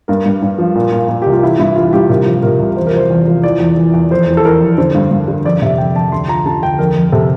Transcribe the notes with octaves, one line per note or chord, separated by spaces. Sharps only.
G2 A#4
G2
G2
F3
A#2
A#2
A#2
C2 G4
F4
E3 E4
G2 E4
E3 F4
G2 G4
C3 A#4
F3
C3 A#4
C2
E2 C5
A#4
F3 C5
E2
F3
E3 D5
E2
E3
E2
F2 C5
E3
A4
E3 A#4
F2
D3 C5
G2
G2
D3
F2 D5
C3 E5
F2 G5
F2 A5
D2 C6
F3 A#5
D3 A5
D2 G5
F2 A#4
F2
C3 A4